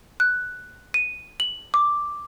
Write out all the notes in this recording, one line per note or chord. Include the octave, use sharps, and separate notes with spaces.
F#6
D#7
F#7
D6